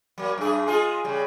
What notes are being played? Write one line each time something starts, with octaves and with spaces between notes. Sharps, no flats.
F#3 A#3
F#2 G#4
G#3 F4 G#4
C#3 G3